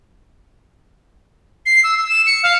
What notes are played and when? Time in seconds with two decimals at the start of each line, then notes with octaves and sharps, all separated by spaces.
1.66 C7
1.84 E6
1.98 E6
2.09 E7
2.26 C#7
2.43 F5